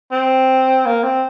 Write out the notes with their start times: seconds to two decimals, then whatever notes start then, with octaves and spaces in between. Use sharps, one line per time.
0.12 C4
0.86 A#3
1.03 C4